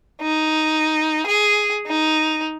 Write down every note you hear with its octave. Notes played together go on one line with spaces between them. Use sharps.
D#4
G#4
D#4